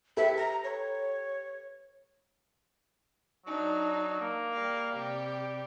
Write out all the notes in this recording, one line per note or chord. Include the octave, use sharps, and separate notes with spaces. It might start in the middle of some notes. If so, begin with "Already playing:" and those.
G4 A4 B4 E5
A#5
C#5
F#3 D4 D#4
A#3
G3 F5
C3 G3 G4